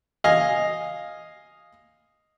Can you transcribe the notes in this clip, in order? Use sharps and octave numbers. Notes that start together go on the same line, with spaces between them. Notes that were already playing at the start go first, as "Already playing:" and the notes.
D#5 F5 G#5